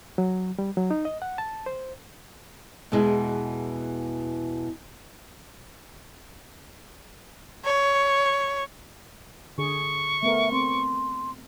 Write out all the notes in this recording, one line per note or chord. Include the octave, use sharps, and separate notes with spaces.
F#3
G3
F#3
D#4
D#5
F#5
A5
C5
E2 B2 E3 G#3
C#5
D3 G#4 C#6
A3 B3 A#4 E5
C4 C6